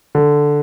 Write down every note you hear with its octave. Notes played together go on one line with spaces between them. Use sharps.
D3